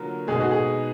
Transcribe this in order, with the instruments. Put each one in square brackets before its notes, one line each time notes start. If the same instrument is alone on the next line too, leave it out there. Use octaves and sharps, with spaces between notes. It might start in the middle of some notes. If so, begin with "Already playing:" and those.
Already playing: [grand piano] D3 F#3 A#3 F4 [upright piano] A#4
[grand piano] B2 G#3 B3 D#4 [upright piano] G#4
[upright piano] F#4
G#4